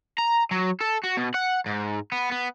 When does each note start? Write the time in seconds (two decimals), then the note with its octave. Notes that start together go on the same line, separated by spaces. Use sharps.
0.18 A#5
0.51 F#3
0.81 A4
1.04 F#4
1.17 B2
1.34 F#5
1.66 G#2
2.12 B3
2.32 B3